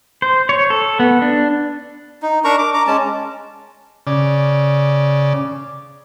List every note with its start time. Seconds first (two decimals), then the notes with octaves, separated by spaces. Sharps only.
0.22 C5
0.49 C#5
0.70 A4
1.00 B3
1.22 D4
2.22 D#4
2.44 D4 A#4 A#5 C#6
2.58 D6
2.74 A#5 D6
2.87 G#3 C#4 A5
4.07 C#3 D5